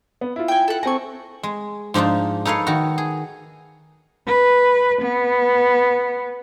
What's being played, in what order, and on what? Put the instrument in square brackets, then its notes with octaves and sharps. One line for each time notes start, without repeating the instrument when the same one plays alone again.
[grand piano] B3
E4 F4
[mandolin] G5 G#5
A4 F#5
[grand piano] C4 A4 G#5 [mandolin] A#5 C#6
[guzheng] G#3
G#2 F3 D4 D#4 F4
D#4 A4 B4 C#5 F5
D#3 F#4
G#4
[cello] B4
B3